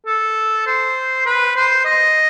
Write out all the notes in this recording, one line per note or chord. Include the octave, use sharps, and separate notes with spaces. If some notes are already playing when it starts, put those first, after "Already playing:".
A4
C5
B4
C5
D#5